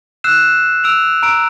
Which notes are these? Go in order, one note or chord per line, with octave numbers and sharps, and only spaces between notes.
E6 F#6 C7 E7
E6 D7 F7
A#5 E6 D7